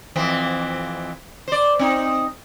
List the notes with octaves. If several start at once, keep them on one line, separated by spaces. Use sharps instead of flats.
F2 E3 C4
C5 D5
C4 D#4